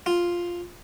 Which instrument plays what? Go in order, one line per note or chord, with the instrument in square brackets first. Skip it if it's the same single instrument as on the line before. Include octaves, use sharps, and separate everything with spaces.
[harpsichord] F4